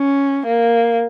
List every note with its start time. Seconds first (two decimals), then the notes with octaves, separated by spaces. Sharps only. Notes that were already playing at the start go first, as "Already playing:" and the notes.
Already playing: C#4
0.47 A#3